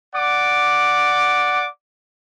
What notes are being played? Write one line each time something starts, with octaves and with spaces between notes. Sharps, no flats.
D5 F#5 D6